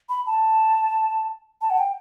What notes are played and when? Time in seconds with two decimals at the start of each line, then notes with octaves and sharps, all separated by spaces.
0.09 B5
0.26 A5
1.62 A5
1.70 F#5
1.78 G5